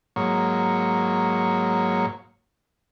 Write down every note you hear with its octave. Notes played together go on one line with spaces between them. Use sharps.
G#2 F#3 A#3 C#5